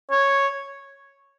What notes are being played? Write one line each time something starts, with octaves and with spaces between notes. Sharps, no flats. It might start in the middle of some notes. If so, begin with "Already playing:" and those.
C#5